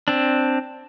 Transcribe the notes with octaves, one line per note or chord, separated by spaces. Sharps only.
C4 D4